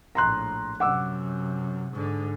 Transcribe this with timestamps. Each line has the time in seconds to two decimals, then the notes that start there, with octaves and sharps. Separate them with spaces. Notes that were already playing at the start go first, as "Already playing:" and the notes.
0.15 A#1 A2 A#5 C6 F#6
0.80 F#2 C3 F#5 D6 E6
1.92 G#2 D3